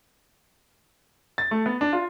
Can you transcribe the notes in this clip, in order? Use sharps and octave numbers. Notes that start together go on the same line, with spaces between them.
A6
A3
B3
D4
F4